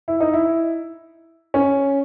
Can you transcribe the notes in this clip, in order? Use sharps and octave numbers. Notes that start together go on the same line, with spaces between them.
E4
D#4
E4
C#4